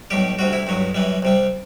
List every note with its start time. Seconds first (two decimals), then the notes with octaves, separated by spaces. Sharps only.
0.10 B1 A2 G3 G4
0.39 D2 C3 G3 F#4
0.53 E4
0.67 A1 G2 F#3
0.94 F#2 E3 G3
1.22 C2 C3 G3